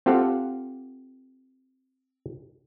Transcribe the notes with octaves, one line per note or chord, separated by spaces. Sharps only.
C4 F4 G4 A4 F5 F#5